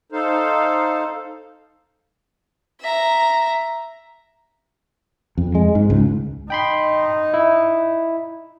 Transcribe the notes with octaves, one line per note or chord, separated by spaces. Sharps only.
D#4 A4 C5 F5
E5 A#5
F2
G#3
G#2
C#2
D#4 G5 B5 C6
E4